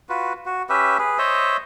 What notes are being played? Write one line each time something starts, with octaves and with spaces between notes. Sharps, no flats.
F4 F#4 B4
F#4
C#4 G4 B4 E5
G#4 B4
C5 C#5 D#5 E5